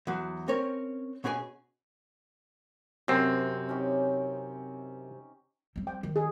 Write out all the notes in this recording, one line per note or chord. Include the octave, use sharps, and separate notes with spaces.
E2 F#3
C4 C#4 A#4 C#5
B2 C#4 G#4 C#5 G#5
F#2 C3 C4
C#4 D#4 G4
G3 C4
G5
D#3
G#4